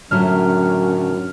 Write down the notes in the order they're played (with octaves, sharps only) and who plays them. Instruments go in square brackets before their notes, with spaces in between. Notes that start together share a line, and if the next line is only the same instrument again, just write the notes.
[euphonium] F#2 [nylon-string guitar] A2 F#3 [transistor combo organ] D3 C#4 [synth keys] F6